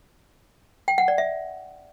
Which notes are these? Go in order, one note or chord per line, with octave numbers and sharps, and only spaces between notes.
G5
F#5
D5
E5